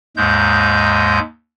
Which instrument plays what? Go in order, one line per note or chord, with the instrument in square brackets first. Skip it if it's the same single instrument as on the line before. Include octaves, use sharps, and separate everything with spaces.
[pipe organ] D#2 G#2 G#3 G6